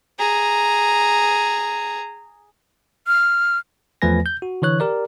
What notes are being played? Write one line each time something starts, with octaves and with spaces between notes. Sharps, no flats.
G#4 A#5
F6
E2 F3 A3 B4 G#5 A#6
G6
F#4
D3 E3 C#5 F#6
G4 A#4 D5